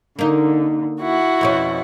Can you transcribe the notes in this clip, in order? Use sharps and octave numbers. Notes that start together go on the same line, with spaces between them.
D3 A#3 D#4
E4 F#4 F#5
F2 B2 C#4